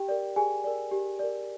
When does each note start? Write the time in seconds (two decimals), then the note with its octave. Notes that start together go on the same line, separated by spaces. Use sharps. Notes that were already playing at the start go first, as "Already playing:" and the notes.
Already playing: G4 G5
0.09 A#4 D5
0.36 G4 G#4 G#5
0.64 A#4 D5
0.91 G4
1.19 A#4 D5